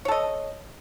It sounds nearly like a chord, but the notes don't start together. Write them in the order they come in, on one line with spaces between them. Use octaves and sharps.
C#5 A4 D#5